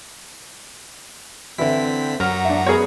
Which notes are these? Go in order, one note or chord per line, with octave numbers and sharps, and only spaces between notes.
D3 E3 C4 E4 B6
F#2 F#3 F#5 A#5 F6
D4 E5
B3 G#4 A#4 C#5